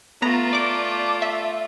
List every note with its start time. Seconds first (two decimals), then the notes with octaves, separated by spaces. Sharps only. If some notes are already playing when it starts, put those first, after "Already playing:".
0.22 A3 B3 F4 A#5
0.53 D5 D6
1.22 E5